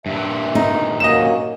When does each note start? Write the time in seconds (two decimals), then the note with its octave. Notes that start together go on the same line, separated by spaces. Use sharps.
0.06 G2 A#2 E5
0.55 D#4
1.00 F#3 A#3 C#4 D#5 E7